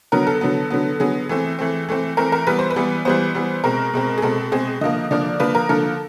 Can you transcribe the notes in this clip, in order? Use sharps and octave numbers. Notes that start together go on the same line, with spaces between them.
D3 F#3 B3 A#4
A4
D3 F#3 B3
D3 F#3 B3
D3 F#3 B3 G#4
E3 A3 C4
E3 A3 C4
E3 A3 C4
E3 A3 C4 A#4
A#4
E3 G3 B3 B4
C5
B4
E3 G3 B3
E3 G3 B3 C5
E3 G3 B3
B2 G#3 C4 A#4
B2 G#3 C4
G#4
B2 G#3 C4 A4
B2 G#3 C4 G#4
D3 F3 A#3 D#5
D3 F3 A#3 D5
D3 F3 A#3 B4
A#4
D3 F3 A#3 A4